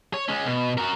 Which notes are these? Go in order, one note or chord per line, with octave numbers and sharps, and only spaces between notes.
C#5
G#3 C#4
B2
F#4 A#4